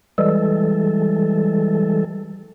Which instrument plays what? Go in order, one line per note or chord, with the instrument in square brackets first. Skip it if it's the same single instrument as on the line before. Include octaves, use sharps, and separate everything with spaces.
[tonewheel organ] E3 G3 G#3 A4